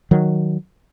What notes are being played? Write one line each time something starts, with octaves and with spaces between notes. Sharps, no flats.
D#3 F#3